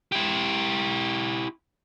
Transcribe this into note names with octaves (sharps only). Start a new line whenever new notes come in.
E4 G4